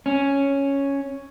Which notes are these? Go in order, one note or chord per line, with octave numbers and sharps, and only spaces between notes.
C#4